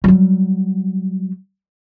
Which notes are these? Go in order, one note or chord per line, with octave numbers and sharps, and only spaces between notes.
F#3 G3